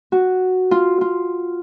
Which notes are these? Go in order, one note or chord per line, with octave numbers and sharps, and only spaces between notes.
F#4
F4
F4